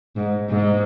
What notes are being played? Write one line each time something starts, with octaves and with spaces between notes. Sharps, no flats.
G#2
G#2